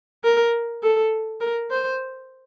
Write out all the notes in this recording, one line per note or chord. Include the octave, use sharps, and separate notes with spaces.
A#4
A4
A#4
C5